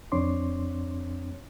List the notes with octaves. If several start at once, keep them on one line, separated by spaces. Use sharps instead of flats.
F2 C4 D4 C#5 C6 D6